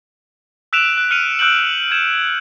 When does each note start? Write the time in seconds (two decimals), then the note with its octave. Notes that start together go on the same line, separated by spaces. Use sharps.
0.73 E6 F#6 B6 D7 E7 F7
0.98 F#6
1.11 F6 C#7 D#7 F7
1.39 E6 F#6 G6 D7 F#7
1.91 G6 G#6 E7